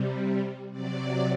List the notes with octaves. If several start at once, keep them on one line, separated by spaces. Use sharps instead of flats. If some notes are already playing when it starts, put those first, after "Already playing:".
Already playing: C3 G3
C3 F#3 D5